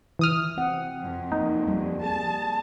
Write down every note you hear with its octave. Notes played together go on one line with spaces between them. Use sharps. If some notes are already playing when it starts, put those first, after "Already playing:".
E3 D#6 F6
C4 F#5
F2
A#3 D#4
G3
G#4 A5